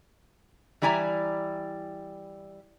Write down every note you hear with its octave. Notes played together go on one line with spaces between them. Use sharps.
E3 G3 E4 D5 G#5 A#5